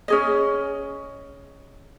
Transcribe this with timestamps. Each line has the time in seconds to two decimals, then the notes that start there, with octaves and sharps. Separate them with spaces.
0.08 C#4 G#4 D#5